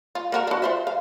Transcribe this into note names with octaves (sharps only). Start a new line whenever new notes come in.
F4
A#3 F#4 A#4
D4 F#4
F4 C5 E5
F5